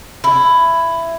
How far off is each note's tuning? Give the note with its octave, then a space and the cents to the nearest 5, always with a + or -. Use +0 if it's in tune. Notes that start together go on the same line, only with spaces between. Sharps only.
E4 +10